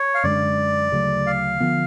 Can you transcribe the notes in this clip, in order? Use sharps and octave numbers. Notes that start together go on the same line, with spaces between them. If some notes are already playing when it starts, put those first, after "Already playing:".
Already playing: C#5
F5
F#2 D3 G#3 D4 D5
D2 C#3 F#3 A3
F5
D3 F3 B3